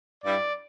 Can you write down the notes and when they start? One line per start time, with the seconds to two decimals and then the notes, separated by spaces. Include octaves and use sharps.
0.24 G2 G3 E4 D5